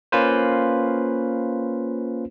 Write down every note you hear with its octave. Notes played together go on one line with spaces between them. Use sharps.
A#3 C#4 F4 B4 C5